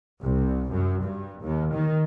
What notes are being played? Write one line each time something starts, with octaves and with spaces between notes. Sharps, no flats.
C2
F#2
G2
D#2
D#3